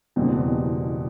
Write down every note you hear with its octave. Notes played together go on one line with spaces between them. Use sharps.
F#1 E2 B2 G3 C4